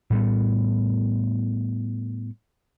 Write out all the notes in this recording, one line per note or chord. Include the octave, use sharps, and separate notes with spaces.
A2 G3 B3